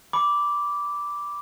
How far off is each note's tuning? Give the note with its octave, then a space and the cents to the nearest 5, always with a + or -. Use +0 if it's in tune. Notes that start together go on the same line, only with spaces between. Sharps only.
B5 +0 D6 -5